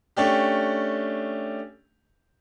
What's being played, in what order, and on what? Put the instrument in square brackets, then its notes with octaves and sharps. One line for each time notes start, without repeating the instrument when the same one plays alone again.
[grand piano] A3 C#4 D4 G4